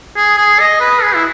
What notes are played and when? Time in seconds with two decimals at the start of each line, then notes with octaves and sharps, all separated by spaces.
0.17 G#4
0.38 G#4
0.60 D#5
0.81 B4
1.02 G#4
1.15 E4